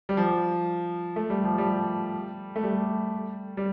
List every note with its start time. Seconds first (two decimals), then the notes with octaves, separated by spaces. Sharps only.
0.09 G3
0.17 F3
1.16 A3
1.30 G3
1.44 F3
1.58 G3
2.56 A3
2.64 G3
3.57 G3